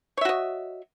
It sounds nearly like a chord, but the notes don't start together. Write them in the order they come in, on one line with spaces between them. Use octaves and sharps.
C#5 E5 F#4 D#5